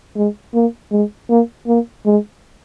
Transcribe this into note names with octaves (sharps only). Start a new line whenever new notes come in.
G#3
A#3
G#3
A#3
A#3
G#3